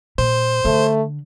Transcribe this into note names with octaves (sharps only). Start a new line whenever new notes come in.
A#2 C5
D3 A3